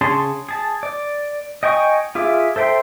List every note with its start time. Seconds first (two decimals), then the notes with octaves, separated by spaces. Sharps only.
0.01 C#3 C#4 G#4 A5 C6
0.49 G#4 A5
0.83 D5
1.63 D#5 G5 G#5 C#6 D#6
2.15 F4 G#4 E5 D6
2.56 A4 C5 E5 G5 C6